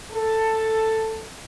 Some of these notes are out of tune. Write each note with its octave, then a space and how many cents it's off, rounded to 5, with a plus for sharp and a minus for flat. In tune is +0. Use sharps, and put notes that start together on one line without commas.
A4 +10